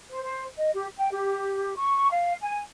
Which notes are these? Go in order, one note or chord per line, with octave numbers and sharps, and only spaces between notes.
C5
C5
D#5
G4
G5
G4
C#6
F5
G#5